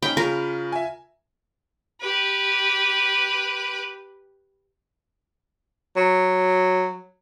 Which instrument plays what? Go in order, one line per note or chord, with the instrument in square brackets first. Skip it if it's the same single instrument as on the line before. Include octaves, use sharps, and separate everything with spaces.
[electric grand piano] C#4 D#4 B5 [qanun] G5
[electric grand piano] C#3 B5 [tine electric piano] F4 [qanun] A#4
[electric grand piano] E5 G#5
[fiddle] G4 B4
[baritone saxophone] F#3